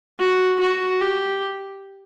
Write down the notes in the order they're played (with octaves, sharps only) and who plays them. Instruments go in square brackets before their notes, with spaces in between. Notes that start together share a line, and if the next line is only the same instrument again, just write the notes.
[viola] F#4
F#4
G4